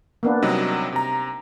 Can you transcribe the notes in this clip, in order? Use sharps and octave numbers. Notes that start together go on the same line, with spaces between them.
A#3 B3 D4
C3 F#3 G3 D#4
C3 A#5